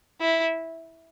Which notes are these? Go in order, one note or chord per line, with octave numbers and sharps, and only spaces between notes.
E4